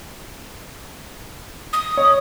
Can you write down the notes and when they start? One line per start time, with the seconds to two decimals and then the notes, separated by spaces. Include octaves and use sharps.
1.73 D#6
1.97 C#5